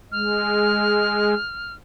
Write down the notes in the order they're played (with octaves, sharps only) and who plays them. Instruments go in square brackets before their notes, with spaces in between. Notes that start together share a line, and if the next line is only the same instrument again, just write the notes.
[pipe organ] G#3 [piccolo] F6